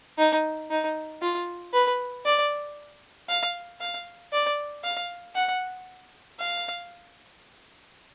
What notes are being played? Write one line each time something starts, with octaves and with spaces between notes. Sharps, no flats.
D#4
D#4
F4
B4
D5
F5
F5
D5
F5
F#5
F5